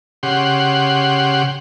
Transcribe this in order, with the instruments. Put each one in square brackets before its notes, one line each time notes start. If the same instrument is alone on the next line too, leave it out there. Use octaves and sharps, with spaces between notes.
[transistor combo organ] C#3 G4 F#5 C6